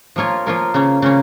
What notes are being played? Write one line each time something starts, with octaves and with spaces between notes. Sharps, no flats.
F3 A#3 F4 A#4 C#5
F3 A#3 F4 A#4 C#5
C#3 A#3 C#4
C#3 A#3 C#4